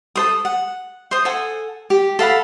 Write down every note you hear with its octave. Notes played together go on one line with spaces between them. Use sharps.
A4 C5 D#6
F#5
C5 D#6
A4 F#5 G#5
G4
A4 F5 F#5 B5